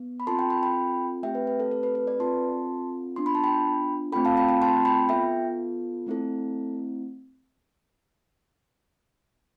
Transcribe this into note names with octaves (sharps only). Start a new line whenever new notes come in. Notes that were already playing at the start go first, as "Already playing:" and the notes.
Already playing: B3
B5
C4 F4 A4 A5 C6
G5 B5
G5 B5
G5 B5
A3 C4 G4 E5 G5
B4
B4
A4
A4
B4
B4
B4 D5
C4 F4 A4 A5 C6
B3 D4 F4 C6
B5
A5
G5 B5
A3 C4 F4 A4 G5 B5
F5 A5
G5 B5
G5 B5
A5 C6
G5 B5
B3 F4 A4 E5 G5
A3 C4 E4 A4